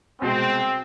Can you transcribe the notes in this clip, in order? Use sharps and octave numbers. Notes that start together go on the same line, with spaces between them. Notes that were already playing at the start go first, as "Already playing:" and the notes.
C2 B2 G#3 C4